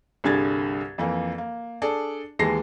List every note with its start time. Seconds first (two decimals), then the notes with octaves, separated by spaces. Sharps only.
0.24 C2 G2 D3 G#4 G#6 A6
0.98 F2 E3 A#3
1.38 A#3
1.82 D4 G#4 A4 D5
2.39 D#2 E3 G#3 A5 A#6 C7